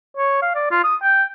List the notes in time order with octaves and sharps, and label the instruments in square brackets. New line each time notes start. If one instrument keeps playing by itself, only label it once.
[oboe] C#5
F5
D5
F4
D#6
G5